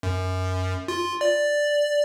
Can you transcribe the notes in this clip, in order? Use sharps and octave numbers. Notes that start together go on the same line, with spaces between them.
F#2
F4
D5